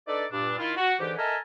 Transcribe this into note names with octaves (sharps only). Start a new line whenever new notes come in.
D4 D#4 A4 B4 D5
G2 A#2 D4
D#3 E4 F4
F#4
G#2 D3 E3 G4
A4 A#4 D#5 E5 G#5 A5